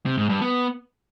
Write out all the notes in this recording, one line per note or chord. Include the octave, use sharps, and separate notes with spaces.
C3
G#2
G2
B3